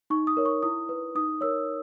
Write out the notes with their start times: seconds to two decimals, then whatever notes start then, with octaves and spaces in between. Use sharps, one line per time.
0.10 D#4 C#6
0.27 D#6
0.37 A#4 C#5
0.45 C#6
0.63 E4 D#6
0.89 B4
1.15 D#4 D#6
1.41 A#4 C#5 E6